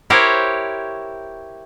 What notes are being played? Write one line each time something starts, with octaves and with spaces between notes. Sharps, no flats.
E4 G4 A#4 C5 C#5